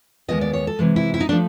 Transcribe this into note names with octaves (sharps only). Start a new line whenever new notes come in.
D#2 D#3 G#3 B3 D#5
D5
C#5
A4
C3 E3 G#3
E4
E4
D#4
F3 A3 D4